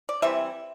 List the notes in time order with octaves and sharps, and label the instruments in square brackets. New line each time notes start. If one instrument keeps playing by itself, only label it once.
[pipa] D5
E3 G3 C4 E4 E5